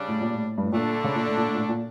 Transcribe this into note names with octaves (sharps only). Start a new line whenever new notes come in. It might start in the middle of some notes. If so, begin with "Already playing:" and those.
Already playing: C#3 G3 D4
A2
A#2
A2
G2
A2
A#2 D3 A3 D4 A4
C#3
A#2
A2
A#2
A2
A#2
A2
A#2